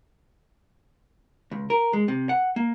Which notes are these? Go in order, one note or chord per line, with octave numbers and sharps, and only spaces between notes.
C#2
A#4
G#3
C3
F#5
A#3